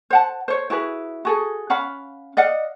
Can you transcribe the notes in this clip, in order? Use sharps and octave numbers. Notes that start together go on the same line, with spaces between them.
C5 F#5 A5
C5 C#5
E4 F#4 G#4 B4
F#4 G#4 A4
C#4 F5 F#5 B5
D5 D#5 F5 F#5